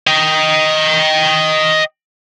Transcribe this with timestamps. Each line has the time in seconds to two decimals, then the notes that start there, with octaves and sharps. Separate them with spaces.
0.07 D#5 G5